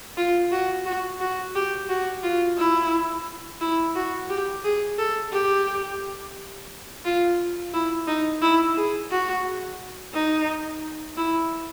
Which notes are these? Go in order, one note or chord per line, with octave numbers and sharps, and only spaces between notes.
F4
F#4
F#4
F#4
G4
F#4
F4
E4
E4
F#4
G4
G#4
A4
G4
F4
E4
D#4
E4
G#4
F#4
D#4
E4